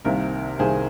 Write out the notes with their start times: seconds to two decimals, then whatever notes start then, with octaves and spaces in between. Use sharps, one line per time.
0.05 C2 C3 D#3 A#3 A#4
0.59 C2 C3 D#3 A#3 G#4 C5